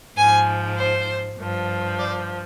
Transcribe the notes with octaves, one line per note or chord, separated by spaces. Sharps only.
G#2 F3 G#5
C5
G2 F3
D5